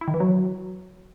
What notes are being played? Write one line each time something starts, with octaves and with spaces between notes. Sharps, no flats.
E4
D#3
E3
F#3